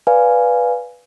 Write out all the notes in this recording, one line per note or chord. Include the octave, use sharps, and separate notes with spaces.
B4 D5 F5 G#5